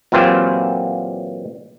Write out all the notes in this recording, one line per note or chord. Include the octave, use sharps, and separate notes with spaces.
A#2 E3 F#3 C4 F4 G4